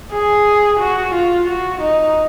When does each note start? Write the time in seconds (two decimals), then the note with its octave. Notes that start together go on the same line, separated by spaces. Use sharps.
0.12 G#4
0.80 F#4
1.14 F4
1.48 F#4
1.81 D#4